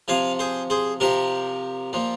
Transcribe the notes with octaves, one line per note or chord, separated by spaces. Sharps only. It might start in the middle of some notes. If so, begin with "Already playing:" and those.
C3 F3 F5 G#5
G#4 C5
G#4 C5
C3 F3 G4 A#4
A#2 F3